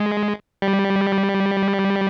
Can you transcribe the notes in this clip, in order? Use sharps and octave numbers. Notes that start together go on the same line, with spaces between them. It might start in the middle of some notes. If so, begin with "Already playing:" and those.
Already playing: G#3
G3